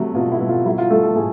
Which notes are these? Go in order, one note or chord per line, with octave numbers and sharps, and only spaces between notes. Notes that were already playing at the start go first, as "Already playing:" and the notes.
Already playing: C3 F#3 A3
B2 F4
E4
B2
F4
F#3 E4
F4
A3 A4
A4
A2 G#4